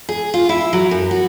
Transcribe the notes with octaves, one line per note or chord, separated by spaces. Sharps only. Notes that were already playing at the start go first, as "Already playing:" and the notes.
G#4
F4
E4
F#3
F#2
F#4